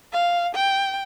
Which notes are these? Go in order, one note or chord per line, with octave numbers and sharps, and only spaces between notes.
F5
G5